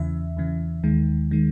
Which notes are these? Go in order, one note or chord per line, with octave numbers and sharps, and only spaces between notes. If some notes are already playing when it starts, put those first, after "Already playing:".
Already playing: E2 C#3 E3 E5
E2 C#3 E3
D#2 D#3 G#3
D#3 G#3